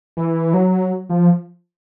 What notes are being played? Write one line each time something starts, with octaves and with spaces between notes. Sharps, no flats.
E3
F#3
F3